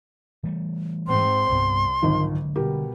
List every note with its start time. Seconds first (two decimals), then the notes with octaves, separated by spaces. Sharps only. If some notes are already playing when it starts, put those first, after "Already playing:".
0.43 E3 G3 A3
1.08 G#2 C4 C6
1.52 C2 G2 B3
2.02 G#1 D3 D#3 F3 F#3 G#3
2.56 B2 G3 G4 A#4